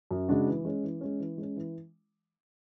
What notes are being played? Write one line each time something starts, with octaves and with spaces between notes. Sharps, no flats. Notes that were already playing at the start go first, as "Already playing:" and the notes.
F#2
C#3 G#3 D4 F#4
E3
G#3 C#4
E3
G#3 C#4
E3
G#3 C#4
E3